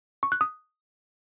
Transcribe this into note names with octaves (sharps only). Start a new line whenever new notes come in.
C#6
F#6
D#6